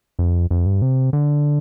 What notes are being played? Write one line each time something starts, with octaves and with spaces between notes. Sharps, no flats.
F2
F2
G2
C3
D3